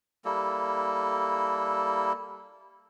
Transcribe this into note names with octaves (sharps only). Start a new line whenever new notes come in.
G3 A#3 E4 A4